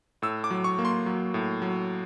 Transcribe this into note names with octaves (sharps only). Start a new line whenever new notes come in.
A2 E6
D6
F#3
C#6
A#3
C6
F#3
A2
F#3